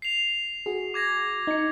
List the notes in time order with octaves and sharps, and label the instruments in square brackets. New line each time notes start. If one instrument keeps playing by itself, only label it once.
[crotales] C7 F7
[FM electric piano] F#4 G#4
[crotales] D6 G#6 A#6
[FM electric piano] D#4 C#7